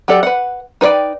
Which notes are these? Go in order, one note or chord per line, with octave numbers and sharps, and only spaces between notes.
F#3 G4 A4 D5
B4 F#5
D#4 B4 C5 D5 G5